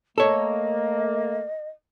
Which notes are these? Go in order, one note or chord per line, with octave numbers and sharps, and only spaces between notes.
A3 A#3 A4 C#5 D#5